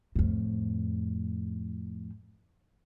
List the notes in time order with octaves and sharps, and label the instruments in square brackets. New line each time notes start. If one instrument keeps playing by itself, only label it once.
[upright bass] F2 A2